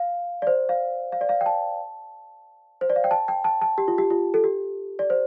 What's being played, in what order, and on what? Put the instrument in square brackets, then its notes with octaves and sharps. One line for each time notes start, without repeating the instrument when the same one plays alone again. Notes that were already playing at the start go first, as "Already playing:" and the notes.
Already playing: [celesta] F5
D5
C5
F5
F5
D5
F5
G5
A5
C5
D5
F5
G5
A5
G5
A5
A5
G4
F4
G4
F4
A4
G4
D5
C5